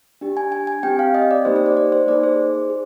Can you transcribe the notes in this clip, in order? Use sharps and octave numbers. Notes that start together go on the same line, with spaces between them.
D4 G4
G#5
G#5
G#5
C4 G4 G5
F5
D#5
D5
A#3 D#4 G4 C5
C5
D5
D5
C5
A#3 D#4 G#4 D5
C5
G#4